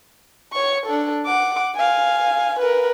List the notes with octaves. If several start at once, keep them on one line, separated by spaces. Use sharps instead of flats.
C#5 C#6
D4 A4
F#5 D6
F5 G#5
A#4 B4